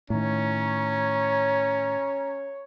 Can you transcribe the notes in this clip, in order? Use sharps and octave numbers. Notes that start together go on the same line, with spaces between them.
A2 D#3 C#4 C#5 A#5